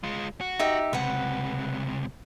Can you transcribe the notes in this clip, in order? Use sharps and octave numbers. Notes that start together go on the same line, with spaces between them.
G#3 F4
F#4
D#4 G4 E5
C#2 C3 B4 F#5